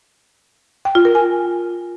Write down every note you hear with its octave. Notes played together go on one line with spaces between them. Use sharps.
G5
F4
A#4
G#5